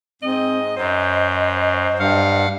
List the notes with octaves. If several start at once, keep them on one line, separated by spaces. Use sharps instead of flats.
G#2 C4 D#5
F#2 F#3 C5 D#5
G2 F5 F#5 F6